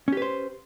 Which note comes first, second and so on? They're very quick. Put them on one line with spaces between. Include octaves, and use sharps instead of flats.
C#4 G4 B4 C5